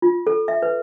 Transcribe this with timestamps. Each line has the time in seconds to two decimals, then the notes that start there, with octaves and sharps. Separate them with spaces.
0.02 F4
0.27 A4
0.48 E5
0.62 B4